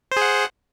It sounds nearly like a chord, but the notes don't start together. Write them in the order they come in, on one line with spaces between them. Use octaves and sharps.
C5 G#4 F#5